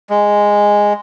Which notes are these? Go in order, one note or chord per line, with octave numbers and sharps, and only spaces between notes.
G#3